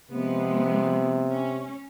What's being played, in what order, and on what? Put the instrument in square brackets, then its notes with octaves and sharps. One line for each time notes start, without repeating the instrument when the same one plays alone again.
[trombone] C3 [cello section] F3 G#3 B3
[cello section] C#4